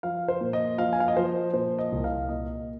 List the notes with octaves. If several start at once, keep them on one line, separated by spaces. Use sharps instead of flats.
F3 F5
C5
A#2
D#5
F3 F5
G#5
F5
D#5
F3 C5
A#2 C5
D#5
C2
F5
A#2 D#5